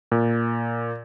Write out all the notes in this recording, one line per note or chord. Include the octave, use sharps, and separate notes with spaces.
A#2